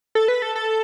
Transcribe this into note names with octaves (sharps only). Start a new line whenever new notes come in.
A4
B4
A4
A4